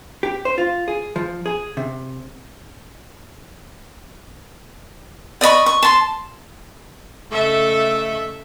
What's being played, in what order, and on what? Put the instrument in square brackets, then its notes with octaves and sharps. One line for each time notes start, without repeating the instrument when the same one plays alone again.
[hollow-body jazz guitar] G4
C5
F4
G#4
F3
G#4
C3
[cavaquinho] D5 D#5 B5 C#6
C#6
A5 C6
[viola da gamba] C#3 A4 D#5 [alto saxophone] A3 [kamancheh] E5